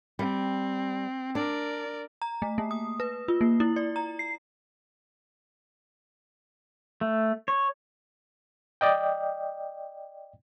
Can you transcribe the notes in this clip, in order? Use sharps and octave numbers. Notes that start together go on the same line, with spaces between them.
G3 C4
D4 A#4 D5
A#5
A3
A#3
D#6
B4
F4
A#3
E4
D5
A#5
C7
A3
C#5
D5 D#5 G5